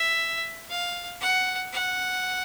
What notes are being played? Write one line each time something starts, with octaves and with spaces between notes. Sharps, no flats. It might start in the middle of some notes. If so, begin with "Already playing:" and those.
Already playing: E5
F5
F#5
F#5